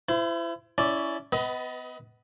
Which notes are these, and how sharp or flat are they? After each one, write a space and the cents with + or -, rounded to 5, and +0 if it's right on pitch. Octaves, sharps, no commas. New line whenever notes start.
E4 +30 C5 -30
C#4 +20 E4 +0 D5 +0
B3 +30 B4 +0 D#5 +30